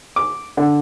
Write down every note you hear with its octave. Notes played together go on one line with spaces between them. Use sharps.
D6
D3